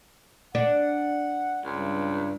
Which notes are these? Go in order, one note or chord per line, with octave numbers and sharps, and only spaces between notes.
D4 F#5
C#2 G2